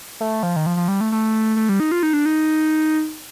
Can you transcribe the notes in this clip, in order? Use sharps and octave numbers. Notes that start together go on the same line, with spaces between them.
A3
F3
D#3
F3
F3
G3
A3
A3
A3
G3
D#4
F4
D#4
D4
D#4